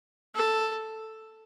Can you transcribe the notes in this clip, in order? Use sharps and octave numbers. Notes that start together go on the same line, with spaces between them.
A4